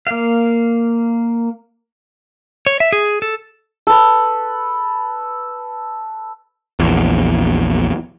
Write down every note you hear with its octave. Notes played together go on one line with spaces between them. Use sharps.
A#3 F5
C#5
E5
G#4
A4
A4 B4
A#1 E2